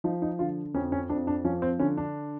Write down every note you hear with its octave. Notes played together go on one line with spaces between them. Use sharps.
F3 D#4
D#4
D3 F4
F2 C#4
C#4
F2 D4
D4
F3 C#4
C4
D3 C#4
D4